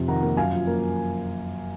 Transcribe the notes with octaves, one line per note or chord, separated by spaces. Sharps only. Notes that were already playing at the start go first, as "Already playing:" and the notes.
Already playing: F2 C3
D#3 F#5 A#5
A#3
F#2 F5 G#5
F3
A#3